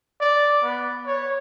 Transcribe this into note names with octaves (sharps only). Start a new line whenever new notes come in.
D5
B3
C#5